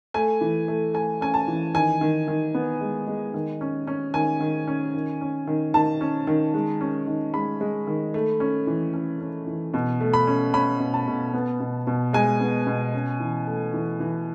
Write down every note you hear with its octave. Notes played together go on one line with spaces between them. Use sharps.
A3 G#5
E3
A3
A3 G#5
C#4 G#5
A5
E3
D#3 G#5
D#3
D#3
B3
G#3
G#3
D#3
C#4
C#4
D#3 G#5
D#3
C#4
D#3
C#4
D#3
D#3 A5
C#4
D#3
G#3
C#4
D#3
G#3 B5
G#3
D#3
A3
C#4
E3
C#4
C#4
E3
B2
A3
B5
C#4
C#4 B5
B2
A5
B2
B3
B2
B2
G#3 G#5
B3
B2
C#4
E3
A3
E3
E3